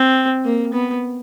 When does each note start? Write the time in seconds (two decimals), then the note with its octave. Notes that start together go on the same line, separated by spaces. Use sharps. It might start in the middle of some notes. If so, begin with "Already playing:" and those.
Already playing: C4
0.45 A#3
0.73 B3